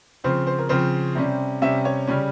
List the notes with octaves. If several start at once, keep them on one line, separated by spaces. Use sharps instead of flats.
C#3 F3 C4 C5
C5
A#4
C#3 F3 C4 C5
C3 G3 C#4
C3 G3 C#4 E5
C#5
C#3 G3 C#4